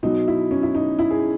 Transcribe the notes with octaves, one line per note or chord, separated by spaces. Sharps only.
B2 F#3 D#4
E4
C#4
E4
D#4
E4
G#4